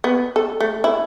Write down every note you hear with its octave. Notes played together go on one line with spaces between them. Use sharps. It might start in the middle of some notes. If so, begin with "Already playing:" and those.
B3
A4
A3
E4